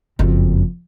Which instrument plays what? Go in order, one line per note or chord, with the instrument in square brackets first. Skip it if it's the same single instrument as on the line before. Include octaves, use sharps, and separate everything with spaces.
[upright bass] F#1 F2